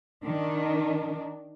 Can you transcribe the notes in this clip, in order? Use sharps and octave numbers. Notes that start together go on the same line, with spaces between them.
D#3 D4